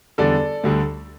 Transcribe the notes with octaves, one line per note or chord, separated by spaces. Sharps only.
E2 D3 G3 A4 D5
D2 D3 G3